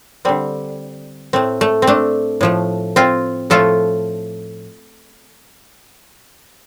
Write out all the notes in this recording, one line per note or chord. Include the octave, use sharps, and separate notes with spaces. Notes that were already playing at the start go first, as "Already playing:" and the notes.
D3 G3 C4
A2 A3 C4
A3
C4
A3 D4
A2 F3 A3
C4 F4
A2 F3 A3 F4 A4